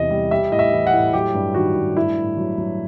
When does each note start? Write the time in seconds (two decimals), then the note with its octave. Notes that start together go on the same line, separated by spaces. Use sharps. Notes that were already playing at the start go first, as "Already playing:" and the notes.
Already playing: E2 C3 E3 D#5
0.10 G3
0.31 G3 E5
0.52 A2 D#5
0.59 E5
0.73 E3
0.87 F#5
0.93 A2
1.13 F#3 G4
1.34 G2
1.54 D#3 F#4
1.75 G2
1.96 A2 E4
2.17 A2
2.37 F#3
2.58 F#3